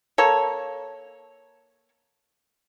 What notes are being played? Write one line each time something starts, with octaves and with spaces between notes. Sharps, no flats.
A#3 A4 C#5